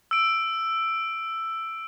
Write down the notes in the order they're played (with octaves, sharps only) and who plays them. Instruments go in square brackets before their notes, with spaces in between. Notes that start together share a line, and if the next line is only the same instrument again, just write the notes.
[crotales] E6 D7